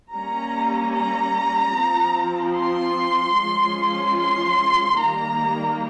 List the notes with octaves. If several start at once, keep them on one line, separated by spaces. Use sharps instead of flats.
G3 A#3 C#4 A#5
A#5
F3 C4
C6
F3 G#3 C#4
C6
D#3 G3 A#3 A#5